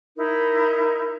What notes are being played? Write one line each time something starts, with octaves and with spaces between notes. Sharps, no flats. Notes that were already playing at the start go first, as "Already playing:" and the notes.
D#4 E4 A#4